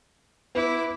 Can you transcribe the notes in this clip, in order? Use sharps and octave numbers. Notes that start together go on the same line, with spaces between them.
B3 E4 D6